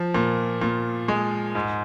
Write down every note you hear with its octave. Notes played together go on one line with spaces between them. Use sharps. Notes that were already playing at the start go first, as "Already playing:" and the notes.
Already playing: F3
A#2
A#2
G#3
G#2